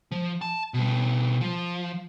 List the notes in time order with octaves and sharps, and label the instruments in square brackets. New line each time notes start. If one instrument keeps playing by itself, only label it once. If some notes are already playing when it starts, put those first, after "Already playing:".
[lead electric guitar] F3
A5
B2 G3
F3